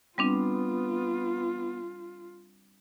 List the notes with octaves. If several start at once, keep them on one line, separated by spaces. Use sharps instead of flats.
G3 B3 C4 D4 F4